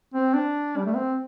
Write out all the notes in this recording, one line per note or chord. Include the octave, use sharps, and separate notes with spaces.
C4
D4
G3
A3
C4